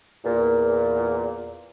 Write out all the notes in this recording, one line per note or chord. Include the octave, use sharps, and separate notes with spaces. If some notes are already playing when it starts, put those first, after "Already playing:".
E2 A#2